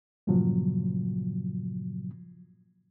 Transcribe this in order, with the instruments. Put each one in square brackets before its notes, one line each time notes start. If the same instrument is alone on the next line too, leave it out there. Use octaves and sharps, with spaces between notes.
[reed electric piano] G2 A#2 C#3 F3 F#3